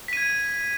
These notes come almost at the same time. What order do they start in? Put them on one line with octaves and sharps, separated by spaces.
B6 D#7 G#6